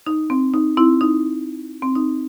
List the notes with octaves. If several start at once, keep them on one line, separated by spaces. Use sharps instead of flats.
D#4
C4
D#4
C4 E4
D#4
C4
D#4